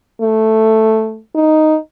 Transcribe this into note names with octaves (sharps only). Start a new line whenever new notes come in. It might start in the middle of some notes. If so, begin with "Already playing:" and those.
A3
D#4